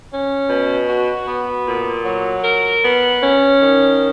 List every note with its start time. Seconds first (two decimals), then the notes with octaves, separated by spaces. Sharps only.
0.11 C#4
0.50 B2
0.88 F#4
1.28 B3
1.66 A#2
2.05 F#3
2.44 A#4
2.83 B3
3.22 C#4
3.61 D#3